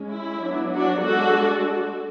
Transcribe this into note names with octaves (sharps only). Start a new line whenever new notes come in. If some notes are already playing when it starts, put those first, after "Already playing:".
Already playing: G#3 C#4
E4
F#3 B3 D4
D4 F#4
G#3 D4 F#4 A4